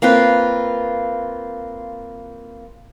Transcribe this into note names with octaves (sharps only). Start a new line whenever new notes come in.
A#3 C4 F4 B4